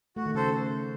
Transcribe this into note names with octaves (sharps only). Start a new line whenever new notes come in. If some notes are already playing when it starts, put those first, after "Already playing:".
A3 F#4
D#3
C#3 A4 C5